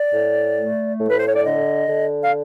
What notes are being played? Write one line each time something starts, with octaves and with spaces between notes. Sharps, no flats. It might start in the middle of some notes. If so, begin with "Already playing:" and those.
Already playing: D5
A2
A3
A2
B4
C5
C#5
D5
D3 D#5
D3
F5